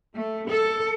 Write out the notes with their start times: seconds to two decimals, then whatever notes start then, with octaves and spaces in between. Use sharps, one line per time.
0.14 A3
0.50 A4